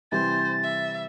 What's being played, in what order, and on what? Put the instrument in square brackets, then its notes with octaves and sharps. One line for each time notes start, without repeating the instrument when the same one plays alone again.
[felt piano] C3 E3 G3 [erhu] C5 [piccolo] A6
[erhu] E5